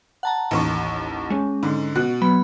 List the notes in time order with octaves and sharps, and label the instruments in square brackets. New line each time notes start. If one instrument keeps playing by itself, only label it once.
[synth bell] F#5 A5 A#5
[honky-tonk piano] A1 D#2 C#6
[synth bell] G#3 C#4
[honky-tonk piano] G#2 D3
B2 F#4 F#6
[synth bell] F#3 B3 B5